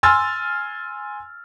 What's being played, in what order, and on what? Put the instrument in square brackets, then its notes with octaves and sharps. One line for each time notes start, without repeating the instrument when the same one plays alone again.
[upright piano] G#5 C6 E6 F6 A6